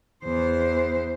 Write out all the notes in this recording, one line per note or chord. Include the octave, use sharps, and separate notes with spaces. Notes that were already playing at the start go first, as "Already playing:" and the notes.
E2 C5